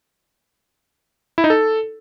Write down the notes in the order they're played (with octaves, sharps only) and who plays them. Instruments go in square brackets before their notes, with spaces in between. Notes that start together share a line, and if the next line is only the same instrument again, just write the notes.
[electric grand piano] E4
D#4
A4